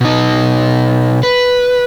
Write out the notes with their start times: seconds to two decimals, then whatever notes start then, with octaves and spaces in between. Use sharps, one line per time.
0.01 B2 D#4
1.23 B4